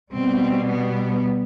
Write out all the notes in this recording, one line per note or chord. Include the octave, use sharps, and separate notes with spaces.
B2 G3 C4
B3